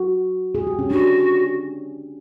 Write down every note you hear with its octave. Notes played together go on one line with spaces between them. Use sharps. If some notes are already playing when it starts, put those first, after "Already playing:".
Already playing: F#4
G#4
G4
C#4
D4 F#4